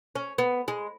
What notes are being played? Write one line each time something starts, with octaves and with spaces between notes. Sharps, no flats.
C#4
B3
G#3